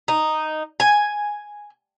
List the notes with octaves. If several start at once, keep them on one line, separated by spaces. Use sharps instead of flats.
D#4
G#5